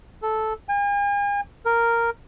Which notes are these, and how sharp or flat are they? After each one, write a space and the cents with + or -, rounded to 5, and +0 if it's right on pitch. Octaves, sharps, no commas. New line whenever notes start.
A4 -10
G#5 -45
A#4 -5